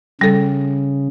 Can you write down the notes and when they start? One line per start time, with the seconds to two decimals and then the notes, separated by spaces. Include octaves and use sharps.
0.21 C#3 G3 A4